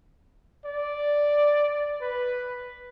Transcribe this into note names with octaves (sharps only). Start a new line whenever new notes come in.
D5
B4